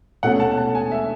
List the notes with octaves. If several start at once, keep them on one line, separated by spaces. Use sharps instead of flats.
B2 A3 C#4 F#5
A5
A5
G#5
E5